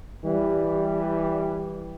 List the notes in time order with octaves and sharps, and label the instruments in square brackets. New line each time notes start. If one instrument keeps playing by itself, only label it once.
[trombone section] E3 G3